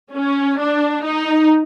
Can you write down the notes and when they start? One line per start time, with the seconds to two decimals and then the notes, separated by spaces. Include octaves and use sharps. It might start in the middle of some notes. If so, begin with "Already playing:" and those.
0.14 C#4
0.59 D4
1.05 D#4